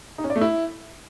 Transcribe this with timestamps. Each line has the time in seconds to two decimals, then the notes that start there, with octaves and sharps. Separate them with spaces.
0.18 D#4
0.24 C#4
0.30 D5
0.36 A3
0.41 E4